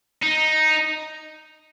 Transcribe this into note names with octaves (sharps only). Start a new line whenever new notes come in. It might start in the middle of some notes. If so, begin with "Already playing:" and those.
D#4